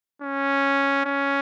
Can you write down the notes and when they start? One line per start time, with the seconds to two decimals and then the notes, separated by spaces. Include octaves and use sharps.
0.22 C#4
1.05 C#4